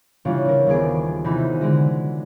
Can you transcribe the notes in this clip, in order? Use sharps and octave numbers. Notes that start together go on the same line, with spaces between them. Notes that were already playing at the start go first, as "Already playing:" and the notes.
C#3 E3 G3 C#4 D4 F4
C4 A#4
D#1 B3 G#4 D6
C3 E3 C4 D#4 F#4 B5
D3 G#3 F#4